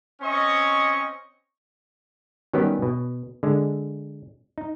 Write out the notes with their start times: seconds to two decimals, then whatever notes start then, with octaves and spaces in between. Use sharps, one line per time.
0.21 C4 C#4 D#5 G#5 C#6
2.53 D#3 F#3 G3 B3 C#4 G4
2.82 B2
3.43 D3 G#3
4.58 D#4